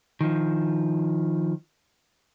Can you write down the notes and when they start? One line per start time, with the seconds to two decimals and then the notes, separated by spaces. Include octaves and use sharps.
0.21 D#3 F3